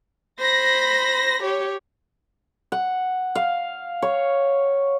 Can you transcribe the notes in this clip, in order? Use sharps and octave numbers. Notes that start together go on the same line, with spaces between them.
C5 B5 A#6
G4 C#5
F#5
F5
C#5